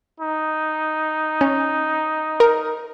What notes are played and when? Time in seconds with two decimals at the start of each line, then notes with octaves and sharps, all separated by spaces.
0.20 D#4
1.41 C#4
2.40 A#4